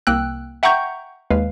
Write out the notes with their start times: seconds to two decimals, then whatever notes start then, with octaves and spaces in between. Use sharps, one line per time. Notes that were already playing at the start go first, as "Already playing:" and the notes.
0.07 C2 A#3 G5 E6 F#6
0.63 E5 F#5 G5 A#5 C#6 G6
1.31 D#2 G#3 B4 F5